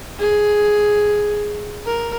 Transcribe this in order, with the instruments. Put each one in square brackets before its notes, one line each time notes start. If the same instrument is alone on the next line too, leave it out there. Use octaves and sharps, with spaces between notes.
[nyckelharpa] G#4
A#4